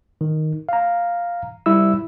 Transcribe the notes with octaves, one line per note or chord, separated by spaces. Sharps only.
D#3
F5 A#5
G3 E4 E6